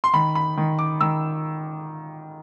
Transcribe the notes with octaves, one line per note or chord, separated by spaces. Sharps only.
C6
D#3 B5
B5
D#3
D6
D#3 E6